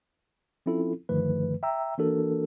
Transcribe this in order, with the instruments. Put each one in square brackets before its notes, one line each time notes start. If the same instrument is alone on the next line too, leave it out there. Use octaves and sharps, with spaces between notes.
[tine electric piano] F3 C4 C#4 E4 F4 A4
G2 D3 D#3 F3 A3 B4
E5 G5 A#5 E6
E3 A#3 D4 F#4 A4 A#4